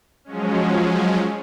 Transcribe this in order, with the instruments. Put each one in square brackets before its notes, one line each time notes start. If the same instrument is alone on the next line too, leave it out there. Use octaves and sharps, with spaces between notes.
[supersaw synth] F3 F#3 G#3 C#4